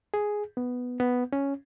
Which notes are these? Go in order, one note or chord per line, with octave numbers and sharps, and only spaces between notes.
G#4
B3
B3
C#4